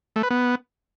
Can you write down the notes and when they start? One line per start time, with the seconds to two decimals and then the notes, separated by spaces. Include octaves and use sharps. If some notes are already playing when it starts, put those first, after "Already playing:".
0.16 A3
0.23 B4
0.30 B3